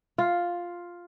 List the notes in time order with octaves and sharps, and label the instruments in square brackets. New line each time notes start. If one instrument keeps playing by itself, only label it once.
[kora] F4